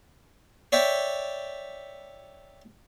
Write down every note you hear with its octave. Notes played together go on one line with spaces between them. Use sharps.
C#5 D5 E5 G5